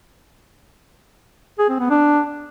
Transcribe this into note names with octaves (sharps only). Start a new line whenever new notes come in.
G#4
C4
B3
D4